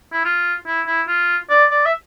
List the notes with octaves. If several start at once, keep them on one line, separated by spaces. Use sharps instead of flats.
E4
F4
E4
E4
F4
D5
D5
E5